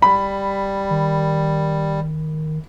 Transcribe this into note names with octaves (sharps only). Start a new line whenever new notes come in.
G3 B5
D#3